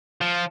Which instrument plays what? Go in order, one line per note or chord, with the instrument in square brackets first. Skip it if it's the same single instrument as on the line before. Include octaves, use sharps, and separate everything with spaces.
[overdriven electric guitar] F3